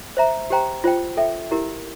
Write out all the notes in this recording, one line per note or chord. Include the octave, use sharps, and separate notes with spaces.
C5 E5 A#5
G4 C5 G5 A#5
F4 C5 G5
A4 E5 G5
E4 G4 A#4